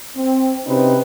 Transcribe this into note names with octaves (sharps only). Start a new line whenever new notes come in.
C4
C3 C4 C#4 D#4 F#4 B4